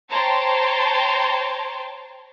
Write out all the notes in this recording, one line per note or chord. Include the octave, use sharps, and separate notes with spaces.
C5 C#5 G5 A5 A#5 C6